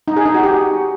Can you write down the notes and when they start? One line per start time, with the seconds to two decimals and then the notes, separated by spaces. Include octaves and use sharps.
0.08 D#4
0.17 G#4
0.25 D#4
0.34 F#4
0.43 G4